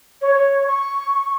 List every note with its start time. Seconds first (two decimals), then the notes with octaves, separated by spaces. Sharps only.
0.21 C#5
0.34 C#5
0.66 C#6